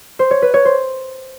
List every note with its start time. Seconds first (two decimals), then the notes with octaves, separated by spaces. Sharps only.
0.19 C5
0.31 C#5
0.42 B4
0.54 C#5
0.65 C5